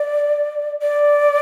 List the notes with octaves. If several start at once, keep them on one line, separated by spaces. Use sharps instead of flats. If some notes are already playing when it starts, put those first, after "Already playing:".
Already playing: D5
D5